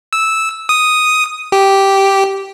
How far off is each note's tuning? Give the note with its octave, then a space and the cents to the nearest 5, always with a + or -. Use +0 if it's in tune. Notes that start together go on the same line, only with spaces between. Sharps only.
E6 -10
D#6 +0
G4 -5